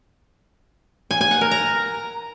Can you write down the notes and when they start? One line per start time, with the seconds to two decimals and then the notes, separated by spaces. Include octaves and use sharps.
1.11 G#5
1.21 G#5
1.31 F#5
1.41 A#4
1.51 A#5